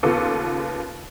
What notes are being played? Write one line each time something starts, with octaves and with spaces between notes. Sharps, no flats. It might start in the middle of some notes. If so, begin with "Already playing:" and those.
D#2 C#3 B3 F4 A4 D6